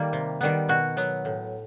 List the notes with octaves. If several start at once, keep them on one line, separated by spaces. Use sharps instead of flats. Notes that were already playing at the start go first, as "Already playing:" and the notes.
Already playing: D#3 G3 A#3
C3
D#3 G3 B3
B2 F#4
F#3 B3
A2